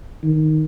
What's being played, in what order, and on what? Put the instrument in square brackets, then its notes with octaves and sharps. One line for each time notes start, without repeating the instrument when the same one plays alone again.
[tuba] D#3